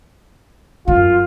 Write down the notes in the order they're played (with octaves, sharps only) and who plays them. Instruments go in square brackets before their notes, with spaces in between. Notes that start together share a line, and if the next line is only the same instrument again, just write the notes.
[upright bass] F#2 [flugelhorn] F4